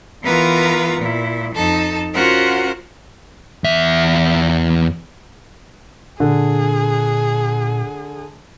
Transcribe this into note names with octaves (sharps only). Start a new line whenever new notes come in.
E3 B3 F4 A#4 B4 A#5
A#2 E4
F2 D#4 A4 A5
C#4 F4 F#4 A#4 C5 F#5
E2 E5
A#2 D3 G#4